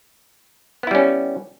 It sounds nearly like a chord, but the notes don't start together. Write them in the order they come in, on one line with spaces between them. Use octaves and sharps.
B3 E4 G3 C#4